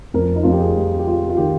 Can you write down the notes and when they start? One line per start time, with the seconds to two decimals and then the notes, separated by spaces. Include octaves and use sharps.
0.14 F2 A#4
0.36 D#4
0.43 F2 F4
0.52 G4
0.60 G#4
0.76 G3
0.99 G4
1.07 G3 F4
1.29 F4
1.37 D#3 G4